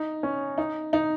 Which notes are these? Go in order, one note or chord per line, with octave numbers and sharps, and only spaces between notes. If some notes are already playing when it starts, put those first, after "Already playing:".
Already playing: D#4
C#4
D#4
D#4